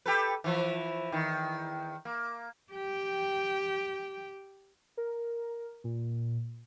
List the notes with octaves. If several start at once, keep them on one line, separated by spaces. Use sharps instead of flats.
G4 A4 B4
E3 F3
E2 D#3
A#3
G4 G5
A#4
A#2